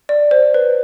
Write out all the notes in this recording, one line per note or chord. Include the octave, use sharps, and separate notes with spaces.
D5
C5
B4